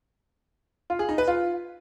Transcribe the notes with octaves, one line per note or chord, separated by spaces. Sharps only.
F4
G#4
D#4
B4
F4